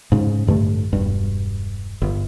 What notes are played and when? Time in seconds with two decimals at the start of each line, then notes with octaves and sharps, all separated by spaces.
0.12 G#2 C#3
0.47 A1 G2 D3 A3
0.93 E1 G2
2.02 G1